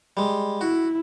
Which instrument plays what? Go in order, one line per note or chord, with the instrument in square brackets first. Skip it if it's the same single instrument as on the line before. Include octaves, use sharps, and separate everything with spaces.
[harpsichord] G3 G#3
[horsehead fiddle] E4 [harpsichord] F#4